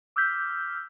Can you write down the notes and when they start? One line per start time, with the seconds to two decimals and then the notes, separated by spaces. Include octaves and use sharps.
0.16 D6 E6 F6 G6 B6